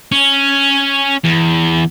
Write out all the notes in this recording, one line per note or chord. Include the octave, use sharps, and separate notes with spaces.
C#4
E2